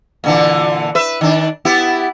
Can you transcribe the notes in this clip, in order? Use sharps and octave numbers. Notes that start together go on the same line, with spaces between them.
A#2 D3 E3
B4 E5
D#3 D4
B3 E4 G4